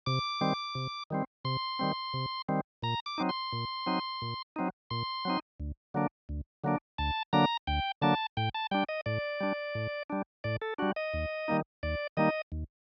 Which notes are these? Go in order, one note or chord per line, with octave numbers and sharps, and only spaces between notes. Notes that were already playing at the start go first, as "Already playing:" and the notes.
C3 D6
D#3 G3 C4
C3
D#3 G3 C4
C3 C6
D#3 G3 C4
C3
D#3 G3 C4
A#2 A#5
D6
F#3 C4 D#4
C6
A#2
F#3 C4 D#4
A#2
F#3 C4 D#4
A#2 C6
F#3 C4 D#4
D2
D3 F#3 A#3 D4
D2
D3 F#3 A#3 D4
D2 A5
D3 F#3 A#3 D4 A#5
D2 G5
D3 F#3 A#3 D4 A5
A2 G5
A5
G3 D4 G5
D#5
A2 D5
G3 D4
A2
G3 D4
A2 D5
A4
G3 D4 F#4
D#5
D#2
D#3 G3 A#3 D#4
D#2 D5
D#3 G3 A#3 D#4 D#5
D#2